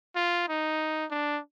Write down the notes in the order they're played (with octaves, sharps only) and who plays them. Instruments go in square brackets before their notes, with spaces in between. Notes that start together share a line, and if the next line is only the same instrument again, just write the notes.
[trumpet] F4
D#4
D4